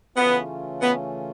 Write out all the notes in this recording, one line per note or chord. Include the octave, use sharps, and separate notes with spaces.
C#3 E3 A3 B3 C#4 F4
B3